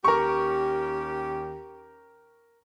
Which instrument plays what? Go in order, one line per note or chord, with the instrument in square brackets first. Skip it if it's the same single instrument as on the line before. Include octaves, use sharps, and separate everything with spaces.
[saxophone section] D#2 C#4 G4 [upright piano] A#4 C#6